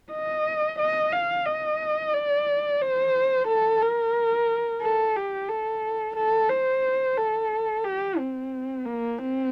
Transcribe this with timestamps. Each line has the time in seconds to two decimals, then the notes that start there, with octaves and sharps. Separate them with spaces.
0.12 D#5
0.79 D#5
1.12 F5
1.46 D#5
2.13 D5
2.81 C5
3.48 A4
3.81 A#4
4.82 A4
5.16 G4
5.49 A4
6.17 A4
6.50 C5
7.18 A4
7.85 G4
8.18 C4
8.85 A#3
9.18 C4